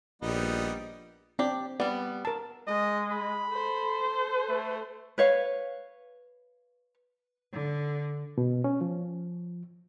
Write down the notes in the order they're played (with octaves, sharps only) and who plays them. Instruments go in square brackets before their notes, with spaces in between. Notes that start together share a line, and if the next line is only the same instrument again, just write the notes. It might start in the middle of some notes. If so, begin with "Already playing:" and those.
[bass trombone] A#1 [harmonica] G3 B3 D#4
[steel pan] C4 [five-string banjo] D4 G4 D5
[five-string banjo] G3 B3 [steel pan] D5
[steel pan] A#4 A5
[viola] G#3 [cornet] D#5
[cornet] B5
[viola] A4 C5
[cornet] A3
[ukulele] B4 C#5 F5
[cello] D3
[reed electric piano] B2
C#4
F3